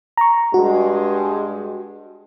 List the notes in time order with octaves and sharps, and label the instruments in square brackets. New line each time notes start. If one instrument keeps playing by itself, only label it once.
[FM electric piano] A#5 C#6
[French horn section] G2 G3 G#3 [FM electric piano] F#4